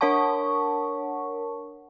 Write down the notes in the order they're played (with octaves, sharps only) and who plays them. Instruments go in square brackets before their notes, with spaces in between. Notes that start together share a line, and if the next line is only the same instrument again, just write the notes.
[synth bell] D4 A#4 C#5 F#5 A5 C#6